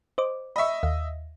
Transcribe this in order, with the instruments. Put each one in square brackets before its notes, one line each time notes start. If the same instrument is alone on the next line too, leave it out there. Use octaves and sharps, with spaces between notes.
[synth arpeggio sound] C5 D#5 D6
[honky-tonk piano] D#5 E5 [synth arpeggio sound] B5 C#6
[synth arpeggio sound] D#2 F5